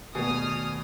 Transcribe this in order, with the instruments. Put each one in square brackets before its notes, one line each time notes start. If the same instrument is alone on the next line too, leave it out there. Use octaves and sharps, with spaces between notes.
[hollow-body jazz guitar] D#2 [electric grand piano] B2 [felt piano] A3 G#4 D5 [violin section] D#6 F6